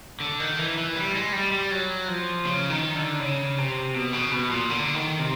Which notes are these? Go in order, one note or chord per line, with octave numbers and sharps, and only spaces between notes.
D3
D#3
E3
E3
G3
G#3
G3
G3
F#3
F3
C#3
D#3
D3
C#3
C3
B2
C#3
B2
A#2
D3
D#3
C3